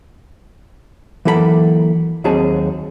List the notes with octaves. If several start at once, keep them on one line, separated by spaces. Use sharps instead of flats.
E3 F#3 A#3 A4 C5 B5
D#2 F#3 C4 G#4 A5